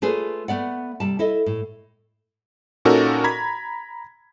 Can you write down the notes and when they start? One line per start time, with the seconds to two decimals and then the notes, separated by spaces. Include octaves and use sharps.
0.02 A3 F4 G#4 B4 C#5
0.48 A3 B3 D5 F#5
1.00 C3 G3 A5
1.19 E4 A4 D#5
1.46 A2
2.85 A#2 C#4 D#4 F#4 A4 A#4
3.24 A#5 B5 G#6 B6